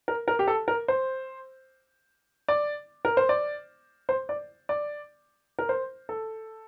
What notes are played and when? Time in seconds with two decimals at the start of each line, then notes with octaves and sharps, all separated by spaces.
0.08 A#4
0.28 A#4
0.39 G4
0.48 A4
0.68 A#4
0.88 C5
2.48 D5
3.05 A#4
3.17 C5
3.29 D5
4.09 C5
4.29 D5
4.69 D5
5.59 A#4
5.69 C5
6.09 A4